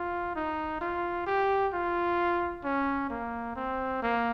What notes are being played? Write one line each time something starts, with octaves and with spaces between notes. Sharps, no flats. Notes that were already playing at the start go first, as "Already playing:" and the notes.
Already playing: F4
D#4
F4
G4
F4
C#4
A#3
C4
A#3